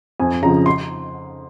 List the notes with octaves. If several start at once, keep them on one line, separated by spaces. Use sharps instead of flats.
F2 G#5
C#3 F3 A#5
C6